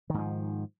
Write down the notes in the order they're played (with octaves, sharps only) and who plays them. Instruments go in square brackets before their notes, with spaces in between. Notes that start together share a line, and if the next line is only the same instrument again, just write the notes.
[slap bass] D#3
G#2
F3